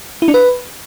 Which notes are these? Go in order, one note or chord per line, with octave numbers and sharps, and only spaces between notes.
E4
D4
B4